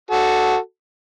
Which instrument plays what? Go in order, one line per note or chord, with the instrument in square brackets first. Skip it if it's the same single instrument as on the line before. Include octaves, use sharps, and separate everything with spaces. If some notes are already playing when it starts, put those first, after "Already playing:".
[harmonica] F#4 A4